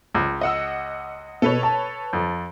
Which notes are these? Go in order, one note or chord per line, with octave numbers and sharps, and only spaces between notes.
C#2
D#5 F#5 E6
B2 A4 B4 C#5
A5
F2